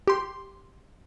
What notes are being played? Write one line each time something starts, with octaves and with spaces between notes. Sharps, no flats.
G4 C6